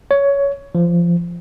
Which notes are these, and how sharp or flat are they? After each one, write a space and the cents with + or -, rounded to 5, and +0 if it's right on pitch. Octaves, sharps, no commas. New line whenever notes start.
C#5 +15
F3 -20